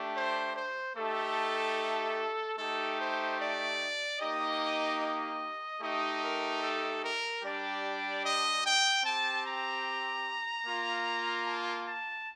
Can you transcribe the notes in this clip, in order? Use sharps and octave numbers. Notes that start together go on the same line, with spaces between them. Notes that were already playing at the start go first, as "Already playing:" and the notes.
Already playing: A3 D4 G4
C5
C5
A3 D#4 G4 A4
A3 D#4 G4 A4
C5
D5
A#3 D#4 G4 D#5
D#5
A3 D#4 G4 D#5
A#4
A4
A#4
G3 D4 G4 D5
D#5
G5
C4 G4 A5
A#5
A#3 F4
A5
A5